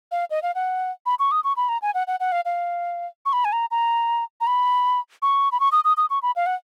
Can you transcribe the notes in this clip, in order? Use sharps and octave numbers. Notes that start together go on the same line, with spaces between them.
F5
D#5
F5
F#5
B5
C#6
D#6
C#6
B5
A#5
G#5
F#5
F#5
F#5
F5
F5
C#6
B5
G#5
A#5
A#5
A#5
B5
C#6
B5
C#6
D#6
D#6
D#6
C#6
B5
F5
F#5